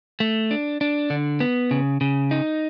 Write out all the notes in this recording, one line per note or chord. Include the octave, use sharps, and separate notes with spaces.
A3
D4
D4
D3
B3
C#3
C#3
D#4